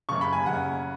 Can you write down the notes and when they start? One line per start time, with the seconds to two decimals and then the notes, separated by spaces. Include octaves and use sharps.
0.09 F#1 F#2 C#3 C#6
0.21 B5
0.33 G#5
0.45 F#1 F#2 C#3 F#5